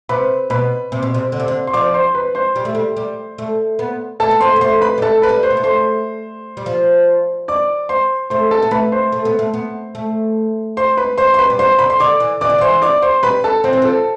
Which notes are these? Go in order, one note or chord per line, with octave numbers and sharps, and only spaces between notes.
C3 B4 B5
B2 B4 B5
C3
B2
C3
D3
C3
D3
C6
F3 D5 D6
C5 C6
B4 B5
C5 C6
G3
A3
G3
G3
A3
B3
A3 A4 A5
B3
A3 C5 C6
B3
A3 C5 C6
B4 B5
G3
A3 A4 A5
B4 B5
G3
C5 C6
B3
A3
C5 C6
G3
F3
D5 D6
C5 C6
A3 C5 C6
A4 A5
B3
A3 B4 B5
C5 C6
A3
B3
A3
B3
A3
C5 C6
B4 B5
C5 C6
C6
B4 B5
G3
F3 C5 C6
D3 B5
C6
D3 D5 D6
E3
E3 D5 D6
D3
E3 C5 C6
D5 D6
C5 C6
G3 B4 B5
A4 A5
F3 C4 C5
E3
F3
A4